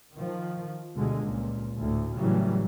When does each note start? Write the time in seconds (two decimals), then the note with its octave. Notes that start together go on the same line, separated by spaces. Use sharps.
0.17 D#3 F3
0.95 D2 B2 D3 G3 G#3
1.25 C#2 A#2
1.79 D2 A2
2.17 A2 C#3 E3 F#3 G3